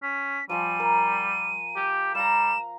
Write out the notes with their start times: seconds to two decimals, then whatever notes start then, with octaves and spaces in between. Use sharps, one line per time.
0.03 C#4 B6
0.50 F3 G3 F4 G#5 D#7
0.80 A#4
1.76 G4
2.15 G3 F5 A#5 E7